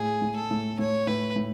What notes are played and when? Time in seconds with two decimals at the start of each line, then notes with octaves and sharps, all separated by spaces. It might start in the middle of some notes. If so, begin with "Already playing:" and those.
Already playing: A2 G#4
0.22 A2
0.36 A4
0.51 A2
0.79 A2 C#5
1.07 A2 B4
1.36 A2